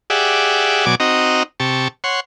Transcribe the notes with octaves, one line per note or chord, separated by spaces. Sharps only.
G4 G#4 D5 E5 F#5
B2 F#3 D5 G#5 D6
C4 D#4 F#4 D#5 A#5
C3 G4 A5 C#6
C#5 F#5 C6